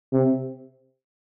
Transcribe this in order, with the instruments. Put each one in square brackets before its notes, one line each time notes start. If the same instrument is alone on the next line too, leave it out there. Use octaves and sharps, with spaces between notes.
[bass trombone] C3